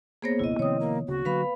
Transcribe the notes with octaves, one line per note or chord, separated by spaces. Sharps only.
A#3 B3 G#4 C5 C#5 A#6
F1 C#2 B2 E4 D#5
C3 D#3 F3 C4 C#5 D#6
A#3
D1 C#3 F#4
D3 F#3 A#3 B4 F5 B5